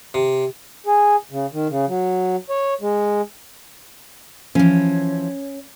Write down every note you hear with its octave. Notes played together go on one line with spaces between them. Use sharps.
C3
G#4
C#3
D#3
C#3
F#3
C#5
G#3
E3 F3 C#4